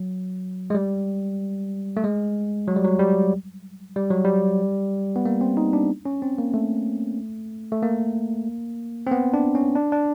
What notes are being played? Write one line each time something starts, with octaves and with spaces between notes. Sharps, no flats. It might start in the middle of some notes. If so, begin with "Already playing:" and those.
Already playing: F#3
G#3
G3
A3
G#3
F#3
G3
F#3
G3
G3
F#3
G3
B3
A#3
C4
D#4
D4
C#4
C4
A#3
A3
A3
A#3
C4
B3
D4
C#4
D4
D4